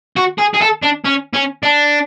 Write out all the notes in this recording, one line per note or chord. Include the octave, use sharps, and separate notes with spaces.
F#4
G#4
G#4
A4
D4
C#4
C#4
D4